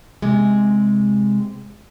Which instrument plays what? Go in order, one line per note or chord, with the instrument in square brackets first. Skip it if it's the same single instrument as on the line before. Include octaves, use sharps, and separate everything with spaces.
[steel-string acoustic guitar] C3 G#3